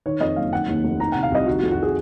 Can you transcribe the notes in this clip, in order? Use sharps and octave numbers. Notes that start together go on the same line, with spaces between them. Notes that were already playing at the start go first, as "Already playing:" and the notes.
D#3 C#5
F2 D#5
F#1 F5
D#3 F#5
D#2
F1
D#3 A#5
C3 F#5
F5
C2 D#5
D#3 F#4
F#4
F2
F#4
G#4